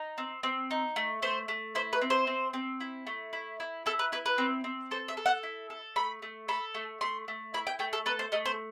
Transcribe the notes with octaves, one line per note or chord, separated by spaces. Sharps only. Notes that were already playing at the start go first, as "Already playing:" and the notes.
Already playing: D#4
C4
C4
D#4
A3
A3 C5
A3
E4 C5
B4
C4
C5
C4
C4
E4
A3
E4
E4
E4 A4
B4
E4 B4
B4
C4
C4
A4 C5
E5
A4
F#5
E4
A4
A3 B5
A3
A4 B5
A3
A3 C6
A3
E4 B5
G5
A3 G5
A4
A4 B4
C5
A3 D#5
C5